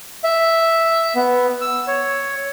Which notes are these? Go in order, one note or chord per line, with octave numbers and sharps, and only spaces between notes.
E5
B3
E6
C#5